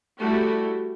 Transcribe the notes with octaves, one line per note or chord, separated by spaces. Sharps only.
G3 A3 E4 F#4 G4